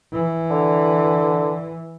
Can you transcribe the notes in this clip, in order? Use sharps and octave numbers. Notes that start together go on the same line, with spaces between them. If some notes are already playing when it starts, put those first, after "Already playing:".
E3
D3